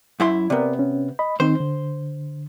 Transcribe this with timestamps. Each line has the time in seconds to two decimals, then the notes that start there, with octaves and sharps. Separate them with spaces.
0.20 F#2 E4 C6
0.50 C3 B3 A#4 D5
0.79 C#4
1.19 D#5 B5
1.40 D#3 C4 D#4 C5
1.60 D3